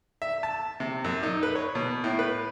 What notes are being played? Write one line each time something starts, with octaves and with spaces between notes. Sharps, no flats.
E5
A5
C3
F#2
D#4
B4
C#5
B2
A2
B4